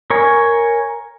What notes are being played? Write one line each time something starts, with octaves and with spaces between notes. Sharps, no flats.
A#4 C#5 G#5